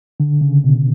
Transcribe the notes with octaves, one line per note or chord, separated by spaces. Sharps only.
D3
C#3
B2